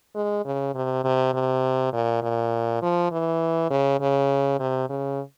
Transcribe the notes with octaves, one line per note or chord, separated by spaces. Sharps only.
G#3
C#3
C3
C3
C3
A#2
A#2
F3
E3
C#3
C#3
C3
C#3